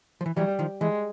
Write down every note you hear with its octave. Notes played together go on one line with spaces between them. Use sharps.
F3
E3
E3 F#3 G3
D#3 F3
E3 G#3